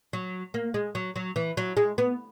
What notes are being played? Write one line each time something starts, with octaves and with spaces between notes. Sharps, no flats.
F#3
A#3
G#3
F#3
F#3
E3
F#3
G#3
B3